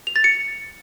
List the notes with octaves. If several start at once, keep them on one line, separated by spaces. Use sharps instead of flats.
F7
A6
C#7